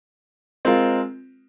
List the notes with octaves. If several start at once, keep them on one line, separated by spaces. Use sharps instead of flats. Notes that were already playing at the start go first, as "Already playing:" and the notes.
G#3 C4 F4 A#4